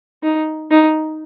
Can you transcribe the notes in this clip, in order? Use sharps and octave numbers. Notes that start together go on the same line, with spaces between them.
D#4
D#4